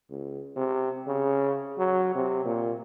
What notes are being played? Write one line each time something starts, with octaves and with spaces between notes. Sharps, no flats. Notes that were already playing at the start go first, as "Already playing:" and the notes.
C#2
C3
C#3
F#3
C3
A#2